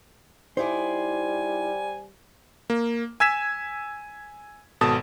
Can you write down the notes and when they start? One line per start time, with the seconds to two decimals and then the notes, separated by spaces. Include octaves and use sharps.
0.57 G3 D#4 E4 C5 D5 G#5
2.70 A#3
3.20 G#5 E6 G#6 B6 E7
4.81 G#1 B2 A4 A5 D#6